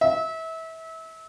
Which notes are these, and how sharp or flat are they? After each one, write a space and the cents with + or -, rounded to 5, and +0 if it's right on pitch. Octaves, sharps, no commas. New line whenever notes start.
E5 -30